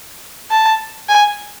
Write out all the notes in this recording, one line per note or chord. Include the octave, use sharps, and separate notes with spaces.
A5
G#5